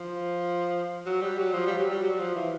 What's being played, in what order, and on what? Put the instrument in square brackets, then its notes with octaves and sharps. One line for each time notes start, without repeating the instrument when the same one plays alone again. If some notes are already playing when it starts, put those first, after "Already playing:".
Already playing: [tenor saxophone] F3
F#3
G3
F#3
F3
G3
F#3
G3
F#3
F3
E3